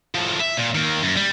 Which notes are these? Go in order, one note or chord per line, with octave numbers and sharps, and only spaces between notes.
A2 F3
E5
A#2
D#3 A#3
F#2
G3